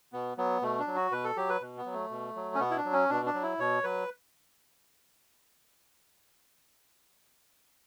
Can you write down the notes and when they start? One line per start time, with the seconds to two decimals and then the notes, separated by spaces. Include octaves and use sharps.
0.13 B2 B3
0.38 F#3 B3
0.62 B2 A3
0.79 D4
0.87 F#3
0.96 F#4
1.11 B2 B4
1.24 A4
1.37 F#3 G4
1.49 B4
1.61 B2
1.77 B3
1.86 F#3
1.94 A3
2.10 B2
2.36 F#3
2.55 C#4
2.60 B2 B3
2.71 E4
2.77 D4
2.85 F#3
2.93 C#4
3.10 B2 D4
3.26 D4
3.34 F#3
3.42 E4
3.59 B2 C#5
3.84 F#3 B4